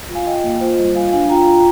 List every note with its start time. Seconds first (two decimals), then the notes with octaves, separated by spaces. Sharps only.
0.09 F4
0.15 F5 G#5
0.26 F4 D#5 G5
0.44 A#3
0.61 F4 C5 D#5
0.79 G3
0.95 F4 F5 G#5
1.12 D4 F5 G#5
1.29 F4 G5 A#5
1.47 F4